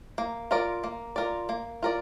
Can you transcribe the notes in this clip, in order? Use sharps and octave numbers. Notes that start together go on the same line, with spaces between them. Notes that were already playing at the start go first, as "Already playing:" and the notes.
A#3
F4 A#4 D5
A#3
F4 A#4 D5
A#3
F4 A#4 D5